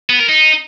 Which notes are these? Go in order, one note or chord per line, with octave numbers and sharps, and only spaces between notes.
B3
A#4
D#4